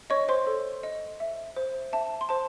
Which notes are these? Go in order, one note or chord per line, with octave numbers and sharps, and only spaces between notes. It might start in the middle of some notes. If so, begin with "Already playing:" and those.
C#5 D#5 C#6
C5 C6
A4
D#5
E5
C5
E5 A5
C6
C5 A5